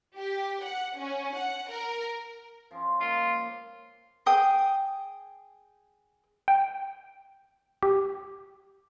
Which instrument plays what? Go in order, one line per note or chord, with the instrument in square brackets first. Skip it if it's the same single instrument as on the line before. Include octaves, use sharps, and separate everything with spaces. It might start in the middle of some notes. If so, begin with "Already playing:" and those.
[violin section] G4
F#5
C#4
F#5
A#4
[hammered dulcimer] F3 C#4 F4
[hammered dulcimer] G#3 A#3 [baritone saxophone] F4
[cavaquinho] G#4 G5 D#6
[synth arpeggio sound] G5
G4